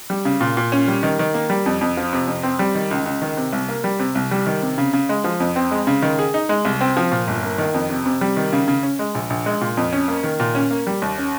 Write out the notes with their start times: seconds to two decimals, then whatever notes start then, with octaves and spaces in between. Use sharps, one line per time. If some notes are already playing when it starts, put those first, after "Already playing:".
0.10 G3
0.25 C#3
0.41 A#2
0.57 A#2
0.72 C#4
0.88 G3
1.03 D#3
1.19 D#3
1.34 A#3
1.50 G3
1.66 F2
1.81 F2
1.97 F3
2.13 C3
2.27 F2
2.43 C4
2.59 G3
2.75 D#3
2.91 C#2
3.06 C#2
3.22 D#3
3.37 C3
3.53 C2
3.69 A#3
3.84 G3
4.00 C3
4.15 C2
4.31 G3
4.46 D#3
4.62 C3
4.78 C#3
4.93 C#3
5.09 G#3
5.24 F3
5.40 F2
5.56 C4
5.71 G#3
5.87 C#3
6.02 D#3
6.19 G#4
6.34 D#4
6.49 G#3
6.65 C2
6.81 C4
6.97 F3
7.12 A#2
7.28 G1
7.43 A#3
7.58 D#3
7.74 F2
7.90 C3
8.06 C3
8.21 G3
8.37 D#3
8.53 C#3
8.68 C#3
8.83 C#4
8.99 G#3
9.15 A#1
9.30 A#1
9.46 G#3
9.61 A#2
9.77 F2
9.93 C#4
10.08 A#3
10.23 D#3
10.40 A#2
10.55 C#4
10.71 A#3
10.87 G3
11.02 D#2
11.18 C#4